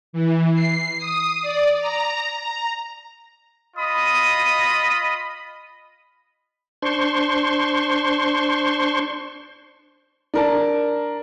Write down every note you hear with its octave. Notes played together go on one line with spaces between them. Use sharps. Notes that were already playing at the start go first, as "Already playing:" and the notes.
E3
C7
D#6
D5
A#5
A#5
F4 D#5 B5 D#6
D4 C5 C6 C#6
D4 A#4 A5